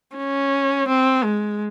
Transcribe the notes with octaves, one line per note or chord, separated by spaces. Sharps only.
C#4
C4
G#3